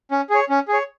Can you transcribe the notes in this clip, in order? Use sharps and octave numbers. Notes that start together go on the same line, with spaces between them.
C#4
G#4 C#5
C#4
G#4
C#5